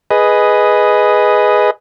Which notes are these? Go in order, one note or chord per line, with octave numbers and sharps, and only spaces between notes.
G#4 B4 D#5